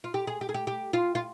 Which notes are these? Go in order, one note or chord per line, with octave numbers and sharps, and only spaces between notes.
F4
G4
G#4
G4
G#4
G4
G4
F4
F4